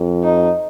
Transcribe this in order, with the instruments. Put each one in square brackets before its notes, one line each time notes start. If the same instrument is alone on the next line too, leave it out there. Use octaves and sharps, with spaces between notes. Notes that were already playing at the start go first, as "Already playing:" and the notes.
Already playing: [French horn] F2
[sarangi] D#4